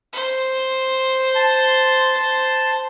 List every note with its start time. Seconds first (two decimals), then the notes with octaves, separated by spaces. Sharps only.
0.13 C5
1.35 A5 C6